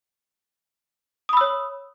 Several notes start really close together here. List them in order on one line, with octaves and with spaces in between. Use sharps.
D#6 B5 E6 C#5